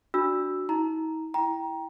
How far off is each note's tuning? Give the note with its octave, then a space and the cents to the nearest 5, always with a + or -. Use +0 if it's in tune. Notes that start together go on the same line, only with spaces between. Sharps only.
D4 +0 F#4 +0 E6 +0
D#4 +45 A#5 +0
E4 +0 G5 +0 A#5 +20